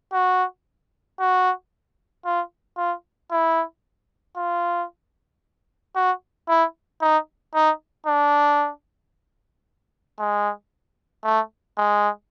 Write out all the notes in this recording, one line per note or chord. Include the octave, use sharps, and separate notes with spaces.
F#4
F#4
F4
F4
E4
F4
F#4
E4
D#4
D#4
D4
G#3
A3
G#3